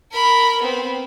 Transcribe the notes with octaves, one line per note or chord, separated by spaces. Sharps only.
A#4 B5
B3 C4